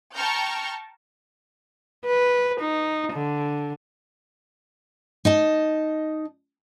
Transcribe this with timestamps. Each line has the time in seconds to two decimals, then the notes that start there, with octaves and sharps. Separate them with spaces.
0.14 G5 A5 A#5 C#6 F6 G6
2.06 B4
2.60 D#4
3.13 D3
5.25 D#4 D#5 A5